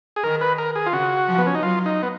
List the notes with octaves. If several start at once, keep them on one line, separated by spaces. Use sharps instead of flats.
G#4
D#3 A#4
B4
A#4
G#4
F4
C#3 F#4
F3
B3
C#4
D#4
F#3 F4
D#4
B3